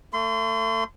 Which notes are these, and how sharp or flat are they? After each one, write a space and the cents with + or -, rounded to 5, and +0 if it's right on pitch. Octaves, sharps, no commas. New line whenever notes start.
A3 +30 C6 -30